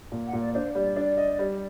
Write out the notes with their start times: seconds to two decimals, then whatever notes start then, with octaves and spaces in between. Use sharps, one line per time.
0.12 A#2
0.26 F#5
0.33 A#2
0.41 D5
0.54 D4 C5
0.75 G3 D5
0.96 D4
1.17 D#5
1.39 G3